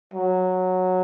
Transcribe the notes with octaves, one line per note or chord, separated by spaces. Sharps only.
F#3